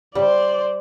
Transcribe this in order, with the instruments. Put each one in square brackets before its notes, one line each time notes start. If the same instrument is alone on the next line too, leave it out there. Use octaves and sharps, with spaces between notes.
[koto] G3 [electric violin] C5 D5